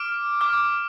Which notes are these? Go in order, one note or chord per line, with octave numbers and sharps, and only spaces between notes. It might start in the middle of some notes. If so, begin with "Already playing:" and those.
Already playing: D6 F6 D7
D6 F6